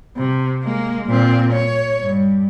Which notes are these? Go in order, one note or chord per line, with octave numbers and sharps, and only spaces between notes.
C3
G#3 A#3
A#2 C4
C#5
G2